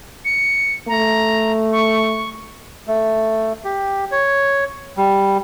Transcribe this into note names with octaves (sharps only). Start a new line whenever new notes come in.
C#7
A3 A#5
C#6
A3
G4
C#5
G3